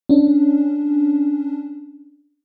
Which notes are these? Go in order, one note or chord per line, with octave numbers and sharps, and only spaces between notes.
C#4 D4